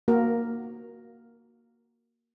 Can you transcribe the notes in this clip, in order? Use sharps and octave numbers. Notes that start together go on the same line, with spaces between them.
A#3 F#4 A#4